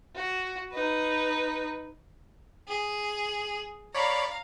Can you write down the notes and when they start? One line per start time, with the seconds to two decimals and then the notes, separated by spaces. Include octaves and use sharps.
0.16 F#4
0.72 D#4 B4
2.68 G#4
3.94 C#5 D5 F5 A#5 B5